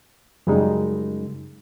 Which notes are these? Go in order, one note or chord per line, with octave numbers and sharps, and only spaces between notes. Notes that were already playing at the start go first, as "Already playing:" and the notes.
F#2 C#3 G3 G#3 D#4